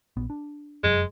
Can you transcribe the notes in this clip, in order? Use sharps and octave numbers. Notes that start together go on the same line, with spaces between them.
A#1 B3
D4
F1 F#2 F#3 G#3